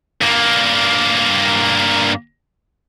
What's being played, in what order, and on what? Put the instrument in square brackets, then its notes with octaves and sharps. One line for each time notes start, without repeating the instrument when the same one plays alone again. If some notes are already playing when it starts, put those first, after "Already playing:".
[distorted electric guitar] G2 A#3